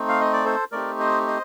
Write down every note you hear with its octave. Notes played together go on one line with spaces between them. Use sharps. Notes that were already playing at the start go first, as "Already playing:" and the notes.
Already playing: A3 C4 D#4
F5
D#5
D5
A4 C5
A3 C4 D#4 G4 A#4 D5
C5 D#5
C5 D#5